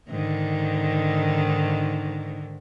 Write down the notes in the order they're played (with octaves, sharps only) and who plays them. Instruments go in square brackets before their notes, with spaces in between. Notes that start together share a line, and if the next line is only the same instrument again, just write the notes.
[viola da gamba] G#2 D3 D#3